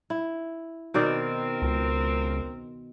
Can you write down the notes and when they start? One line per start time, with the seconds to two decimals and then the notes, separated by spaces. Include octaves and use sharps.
0.10 E4
0.94 B2 D#3 C4 A#4 D5
1.62 C#2